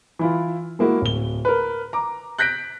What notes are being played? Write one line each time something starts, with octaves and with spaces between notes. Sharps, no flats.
E3 E4 F4
G#3 A#3 E4 F#4
D1 G7
A#4 B4
A#5 D6
F#6 G6 A#6 B6 D7